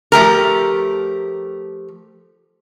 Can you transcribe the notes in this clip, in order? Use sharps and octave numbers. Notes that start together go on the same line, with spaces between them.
F3 A3 G4 A#4